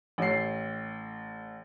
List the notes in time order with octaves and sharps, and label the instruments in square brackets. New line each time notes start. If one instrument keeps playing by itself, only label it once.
[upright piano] A1 C#5 C7